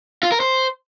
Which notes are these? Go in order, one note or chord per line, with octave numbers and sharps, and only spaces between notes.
F4
A#4
C5